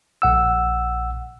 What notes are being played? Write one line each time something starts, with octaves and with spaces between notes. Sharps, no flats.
A#1 F#5 E6